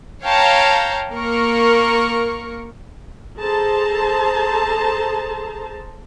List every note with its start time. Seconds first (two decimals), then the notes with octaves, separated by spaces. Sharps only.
0.24 C#5 F5 G5 A5 A#5
1.12 A#3 A#4 C#6
3.39 G#4 A4 C5 A5 A#5